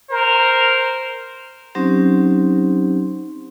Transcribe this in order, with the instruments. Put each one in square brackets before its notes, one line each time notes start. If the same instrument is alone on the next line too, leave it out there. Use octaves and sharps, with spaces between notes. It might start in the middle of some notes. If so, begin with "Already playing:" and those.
[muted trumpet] A#4 [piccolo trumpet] C5
[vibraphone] F#3 C4 C#4 D#4 G4 C5